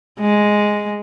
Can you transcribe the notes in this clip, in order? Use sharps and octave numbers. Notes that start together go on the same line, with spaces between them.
G#3